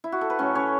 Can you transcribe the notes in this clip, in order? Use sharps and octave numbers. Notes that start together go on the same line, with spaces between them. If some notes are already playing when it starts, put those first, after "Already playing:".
E4
F#4
A4
B4
A2 F#3 A3 C#4 C#5
C#4 C#5